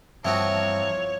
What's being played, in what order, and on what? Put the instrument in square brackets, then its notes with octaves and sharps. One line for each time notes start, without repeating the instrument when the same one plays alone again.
[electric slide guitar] G2 A5 [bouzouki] E3 A#3 [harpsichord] F3 C4 F#4 [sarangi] C#5